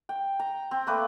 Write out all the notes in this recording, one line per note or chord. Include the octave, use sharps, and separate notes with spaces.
G5
A#5
C4
A3 A#3 B4 D5